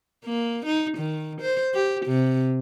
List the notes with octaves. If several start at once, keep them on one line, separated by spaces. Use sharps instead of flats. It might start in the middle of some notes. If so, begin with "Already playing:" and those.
A#3
D#4
D#3
C5
G4
C3